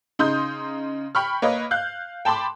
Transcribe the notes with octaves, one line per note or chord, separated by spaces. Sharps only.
C#3 D#4 C6 D#6 G6
G5 B5 C#6 F6
A#3 B4 C#5 D#5
F5 F#6 G6
G5 A5 B5 C6 D6